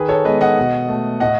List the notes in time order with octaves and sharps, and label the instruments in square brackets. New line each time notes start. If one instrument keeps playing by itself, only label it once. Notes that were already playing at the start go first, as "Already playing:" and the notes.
Already playing: [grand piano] D#3 G#4 B4
A4 C#5
G#3 B3 B4 D#5
D#5 F#5
B2
A3
A2 D#5 F#5